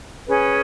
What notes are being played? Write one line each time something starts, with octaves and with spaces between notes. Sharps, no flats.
C#4 G#4 B4